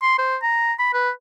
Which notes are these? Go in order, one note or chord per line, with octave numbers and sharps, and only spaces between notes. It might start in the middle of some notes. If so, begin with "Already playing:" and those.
C6
C5
A#5
B5
B4